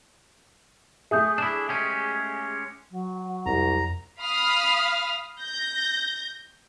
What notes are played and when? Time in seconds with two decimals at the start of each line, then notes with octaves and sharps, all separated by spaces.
1.11 A3 G#4 E5 D#6 G6
1.38 D4 E4 E7
1.69 G#3 C#4 G4
2.90 F#3
3.46 C2 F2 A#5
4.21 F5 B5 D#6 F6
5.41 G6 A#6